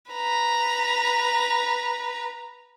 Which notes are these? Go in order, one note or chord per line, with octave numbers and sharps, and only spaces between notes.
B4 A#5